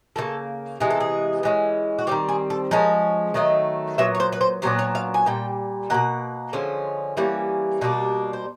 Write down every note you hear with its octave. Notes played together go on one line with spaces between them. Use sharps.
C#3 F3 A#3 A4
C3 E3 G#3 B3 G#4
A4
G#4
E3 G#3 C#4
F#4
D#3 G3 C4 G4
G#4
A4
F3 G#3 C#4 A#4
D#3 F#3 A3 D#5
A#2 F#3 B3 E5
C#5
C5
B4
C5
A#2 F#3 B3 D4 C5
C#5
F5
G#5
A#2 G3 G5
B2 F#3 A#3 F#5
D3 F3 G#3 C#4
E3 G3 A#3 C#4
B2 G3 A#3 D4
C5